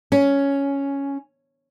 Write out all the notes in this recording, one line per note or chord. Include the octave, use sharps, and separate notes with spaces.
C#4